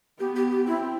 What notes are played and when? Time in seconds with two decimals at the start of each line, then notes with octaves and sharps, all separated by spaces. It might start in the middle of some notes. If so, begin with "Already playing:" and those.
0.19 B3 G4
0.36 G4
0.52 G4
0.67 C4 E4